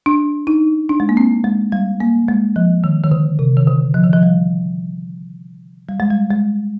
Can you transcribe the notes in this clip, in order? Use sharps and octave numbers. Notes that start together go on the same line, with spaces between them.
D4
D#4
D4
G#3
A#3
C4
G#3
G3
A#3
G#3
F3
D#3
D#3
D3
C3
D#3
D3
F3
D#3
F3
G3
G3
G#3
G3
G#3